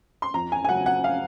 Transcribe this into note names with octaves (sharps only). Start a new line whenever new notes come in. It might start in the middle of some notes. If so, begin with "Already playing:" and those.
C6
F2 A#5
G#5
G#5
C#3 F#3 F#5
F#5
F5